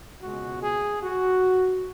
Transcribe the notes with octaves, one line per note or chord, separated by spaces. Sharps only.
C#2 B2 G#3 F#4
G#4
F#4